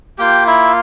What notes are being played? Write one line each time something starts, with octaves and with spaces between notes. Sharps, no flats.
A#3 F4 G4 G5
E4 E5